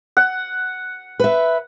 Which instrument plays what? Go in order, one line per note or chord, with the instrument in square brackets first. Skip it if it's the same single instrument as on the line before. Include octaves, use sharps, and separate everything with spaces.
[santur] F#5
[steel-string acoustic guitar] B4 E5